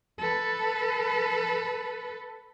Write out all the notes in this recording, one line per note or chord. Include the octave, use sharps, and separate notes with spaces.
A4 B4